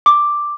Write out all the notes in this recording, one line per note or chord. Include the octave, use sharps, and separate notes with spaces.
D6